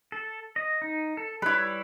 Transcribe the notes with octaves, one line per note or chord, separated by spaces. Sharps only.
A4
D#5
D#4
A4
G3 E4 B4 C#5